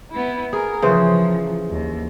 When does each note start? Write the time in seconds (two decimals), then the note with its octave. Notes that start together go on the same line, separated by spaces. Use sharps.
0.11 B3 E4
0.53 G#4 A#4
0.82 C#3 E3 F3 C5
1.70 D#2